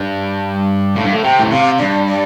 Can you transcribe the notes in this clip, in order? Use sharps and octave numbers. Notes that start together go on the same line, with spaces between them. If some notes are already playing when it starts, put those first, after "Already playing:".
Already playing: G2
A2 F5
G2
A2
C3 G5
A2
C3 F5
G2 D5
D5